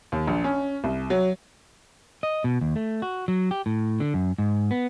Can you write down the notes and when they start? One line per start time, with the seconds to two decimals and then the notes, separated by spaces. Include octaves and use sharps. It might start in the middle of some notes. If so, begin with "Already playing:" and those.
0.12 D#2
0.27 A#1
0.44 C#4
0.84 C2
1.10 F#3
2.23 D#5
2.44 B2
2.61 D#2
2.76 A3
3.02 F#4
3.28 F#3
3.51 G4
3.66 A2
4.00 D3
4.14 F#2
4.39 G#2
4.71 B3